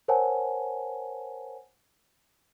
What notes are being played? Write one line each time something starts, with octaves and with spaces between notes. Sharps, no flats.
A#4 C5 C#5 F#5 G#5 A5